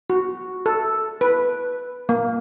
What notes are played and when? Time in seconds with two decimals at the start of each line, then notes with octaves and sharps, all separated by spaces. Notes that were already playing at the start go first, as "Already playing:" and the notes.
0.10 F#4
0.66 A4
1.21 B4
2.09 A#3